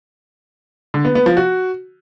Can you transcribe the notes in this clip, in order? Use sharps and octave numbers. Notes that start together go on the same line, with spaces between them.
D3
B3
B3
F3
F#4